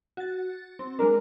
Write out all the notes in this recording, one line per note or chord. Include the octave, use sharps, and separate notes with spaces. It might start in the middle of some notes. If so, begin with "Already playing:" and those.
F#4 A6
C4
G#3 D4 A#4